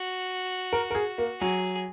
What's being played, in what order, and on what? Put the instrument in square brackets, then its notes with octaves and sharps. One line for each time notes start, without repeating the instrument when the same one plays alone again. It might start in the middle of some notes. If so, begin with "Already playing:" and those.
Already playing: [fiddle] F#4
[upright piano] A#4
A#4
G#4
A#3
[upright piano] F#3 [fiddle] G#4